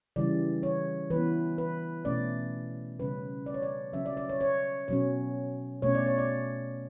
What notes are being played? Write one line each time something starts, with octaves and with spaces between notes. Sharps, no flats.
C#3 E3 G3 D5
C#5
E3 B3 B4
B4
B2 A3 C#4 D5
C#3 G3 C#4 B4
D5
C#5
D5
C#3 F#3 C#4 E5
D5
D5
C#5
C#5
B2 F#3 C#4 C#5
B2 A3 C#4 C#5
D5
C#5
D5